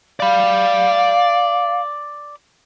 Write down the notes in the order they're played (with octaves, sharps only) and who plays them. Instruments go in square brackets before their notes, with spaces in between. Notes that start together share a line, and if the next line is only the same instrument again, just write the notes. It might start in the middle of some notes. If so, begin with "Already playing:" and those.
[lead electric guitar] D5 B5 [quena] F5